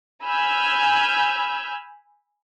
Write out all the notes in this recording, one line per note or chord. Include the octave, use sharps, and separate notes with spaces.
G#5 B5 E6 F6 G6 G#6